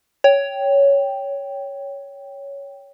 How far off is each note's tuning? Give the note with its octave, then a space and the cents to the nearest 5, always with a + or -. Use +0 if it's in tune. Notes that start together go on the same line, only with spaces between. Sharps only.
C#5 +10 G5 +0